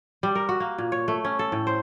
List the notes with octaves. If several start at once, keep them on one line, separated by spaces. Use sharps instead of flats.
G3
A#4
F#4
A#3
A#2
C#5
A3
C#4
A4
A2
C5